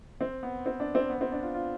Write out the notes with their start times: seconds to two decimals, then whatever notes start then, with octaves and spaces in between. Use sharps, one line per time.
0.21 C4
0.43 B3
0.66 C4
0.80 D4
0.95 C4
1.10 B3
1.21 C4
1.32 D4
1.43 F4
1.54 F4